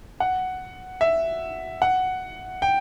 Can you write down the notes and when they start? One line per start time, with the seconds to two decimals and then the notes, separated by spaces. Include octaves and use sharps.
0.20 F#5
1.01 E5
1.82 F#5
2.62 G5